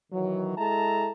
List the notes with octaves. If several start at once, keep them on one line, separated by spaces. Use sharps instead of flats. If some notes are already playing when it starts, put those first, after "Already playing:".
D#3 E3 F#3
G#3 E4 A4 A5 A#5